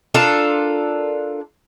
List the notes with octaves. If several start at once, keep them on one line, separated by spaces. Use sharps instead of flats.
D4 F4 A4 A#4